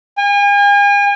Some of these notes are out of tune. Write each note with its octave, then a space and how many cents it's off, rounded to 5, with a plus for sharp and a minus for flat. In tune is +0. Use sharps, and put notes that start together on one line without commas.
G#5 -40